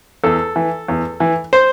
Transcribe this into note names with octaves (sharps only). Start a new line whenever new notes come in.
E2 A4
E3
E2
E3
C5